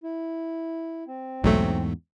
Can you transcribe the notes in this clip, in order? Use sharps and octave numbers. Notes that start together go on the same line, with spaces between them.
E4
C4
B1 E2 G#2 F#3 A3